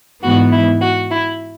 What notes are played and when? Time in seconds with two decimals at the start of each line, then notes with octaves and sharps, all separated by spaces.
0.22 G#2 E3 B3 F#4
0.52 E4
0.81 F#4
1.11 E4